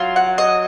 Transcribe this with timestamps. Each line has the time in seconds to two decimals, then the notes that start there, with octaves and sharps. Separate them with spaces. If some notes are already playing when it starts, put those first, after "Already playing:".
Already playing: F#3 F4
0.16 F#5
0.38 D#5